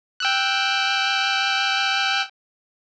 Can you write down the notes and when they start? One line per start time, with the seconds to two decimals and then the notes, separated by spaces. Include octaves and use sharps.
0.20 G5 E6 F#6